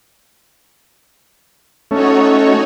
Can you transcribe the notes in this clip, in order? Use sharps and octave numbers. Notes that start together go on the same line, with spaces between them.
A3 C#4 D#4 F#4 C#5